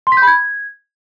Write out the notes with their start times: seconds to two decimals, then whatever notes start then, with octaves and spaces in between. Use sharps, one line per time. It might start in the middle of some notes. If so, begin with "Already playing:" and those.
0.07 C6
0.12 B6
0.17 G6
0.22 B5
0.27 G#6